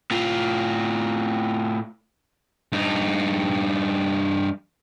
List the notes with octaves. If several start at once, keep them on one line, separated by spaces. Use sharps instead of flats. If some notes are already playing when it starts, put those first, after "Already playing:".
A2 F4
G2 D#4